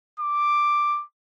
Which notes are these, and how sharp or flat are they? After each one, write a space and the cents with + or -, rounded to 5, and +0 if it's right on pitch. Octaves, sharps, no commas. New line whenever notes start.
D6 +5